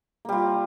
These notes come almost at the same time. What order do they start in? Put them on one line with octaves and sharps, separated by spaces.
A#3 G3 F4